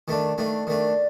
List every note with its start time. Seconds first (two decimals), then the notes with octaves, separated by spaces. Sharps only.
0.08 D#3 A3 D4
0.38 D#3 A3 D4
0.67 D#3 A3 D4 D5